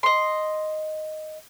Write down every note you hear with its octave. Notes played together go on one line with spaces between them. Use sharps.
D#5 C6